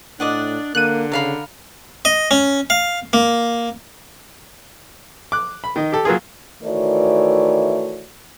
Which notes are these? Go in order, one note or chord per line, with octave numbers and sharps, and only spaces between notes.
A2 D4 D5 D#5 F#5
D3 A#3 F#6 D#7
C#3 A#4 F5 B5
D#5
C#4
F5
A#3
D6 F#6
B5
D#3 D#5
G4 A4
F#3 A#3 F4 G#4
D#3 E3 A3 F#4 C#5 D5